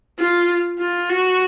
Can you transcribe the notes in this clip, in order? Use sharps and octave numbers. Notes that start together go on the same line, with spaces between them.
F4
F4
F#4